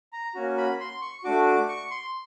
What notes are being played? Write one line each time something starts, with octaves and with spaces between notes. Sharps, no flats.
A#5
A#3 C#4 F#4
B5
C6
C#6
A3 D4 F#4 D6
D6
C#6
C6